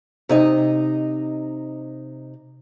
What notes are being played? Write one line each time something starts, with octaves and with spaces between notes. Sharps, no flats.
C3 D#4 D#5